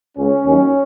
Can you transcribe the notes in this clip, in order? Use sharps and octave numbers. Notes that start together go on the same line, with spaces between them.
C#2 C#3 G#3 C#4
D#2 D#3 F#3